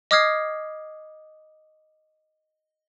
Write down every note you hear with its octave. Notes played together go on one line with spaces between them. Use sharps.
D#5 D6 D#6 F6 G#6 C7